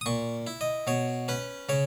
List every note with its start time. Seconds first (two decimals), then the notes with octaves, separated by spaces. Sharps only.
0.01 D#6
0.06 A#2 C#6
0.47 E4
0.61 D#5
0.87 B2 C#5
1.28 C#4 B4
1.69 C#3 C#5